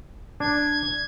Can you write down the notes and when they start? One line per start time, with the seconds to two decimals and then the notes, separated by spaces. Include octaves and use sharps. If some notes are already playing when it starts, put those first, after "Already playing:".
0.40 D4 G#6